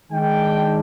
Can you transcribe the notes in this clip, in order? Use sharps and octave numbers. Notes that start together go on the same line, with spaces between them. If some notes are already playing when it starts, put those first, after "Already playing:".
D#3 G#3 D4 G5